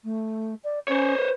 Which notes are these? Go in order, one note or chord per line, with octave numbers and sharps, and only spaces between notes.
A3
D5
C#4 C5 C#5
B4